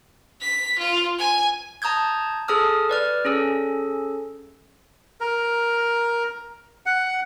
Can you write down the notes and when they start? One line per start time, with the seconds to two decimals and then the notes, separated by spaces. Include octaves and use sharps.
0.41 B6
0.78 F4
1.19 G#5
1.82 A5 A#5 D#6 G6 G#6
2.48 G#4 A4 A5 D#6 F6
2.89 B4 D5 F6
3.25 C#4 G#4 A4
5.21 A#4
6.86 F#5